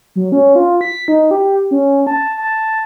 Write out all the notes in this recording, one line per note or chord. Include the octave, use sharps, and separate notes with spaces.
F#3
C#4
F4
B6
D#4
G4
C#4
A5
A5